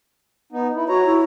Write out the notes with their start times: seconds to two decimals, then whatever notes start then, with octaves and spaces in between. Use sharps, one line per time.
0.52 B3 D#4
0.75 E4
0.88 F#4 C#5 A#5
1.05 E4